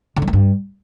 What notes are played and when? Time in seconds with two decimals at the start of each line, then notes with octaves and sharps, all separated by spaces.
0.16 D3
0.22 F#3
0.28 A#3
0.33 G2